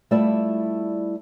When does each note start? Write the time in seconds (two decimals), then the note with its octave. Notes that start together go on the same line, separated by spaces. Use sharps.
0.11 G3 A3 E4 F4 D5 E5